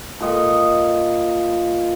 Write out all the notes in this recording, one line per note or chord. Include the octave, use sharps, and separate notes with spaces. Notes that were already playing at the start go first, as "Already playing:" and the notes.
A#2 D#5